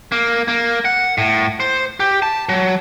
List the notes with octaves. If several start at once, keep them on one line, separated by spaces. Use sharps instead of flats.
A#3
A#3
F#5
A2
C5
G4
A5
F#3